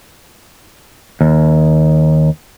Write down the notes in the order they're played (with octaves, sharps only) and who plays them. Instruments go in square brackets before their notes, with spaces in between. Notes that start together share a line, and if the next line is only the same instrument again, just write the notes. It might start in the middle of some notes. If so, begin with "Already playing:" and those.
[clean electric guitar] D#2